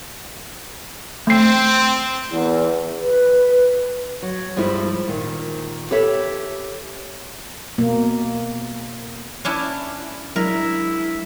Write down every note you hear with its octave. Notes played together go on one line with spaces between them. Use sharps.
A3 C4 C7
E2
B4
F#3
G2 F3 G3 G#3 E4
A#2 D#3
G4 A4 B4 C#5 E5
B2 A#3
C#4 D4 E4
F#3 G#3 D4 E4 A#4